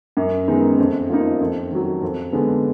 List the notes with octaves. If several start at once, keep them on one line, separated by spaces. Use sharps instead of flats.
F#2
D#3 G#3 B3 D#4
F2
F3 A#3 D#4
F2
D#3 F#3
F2
D3 G#3 B3